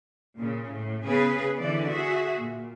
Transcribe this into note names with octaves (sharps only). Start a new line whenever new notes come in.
A#2 C#3
A2
C#3 B3 G#4 B4
D3 E3 D5
F#4 G#4 E5
A#2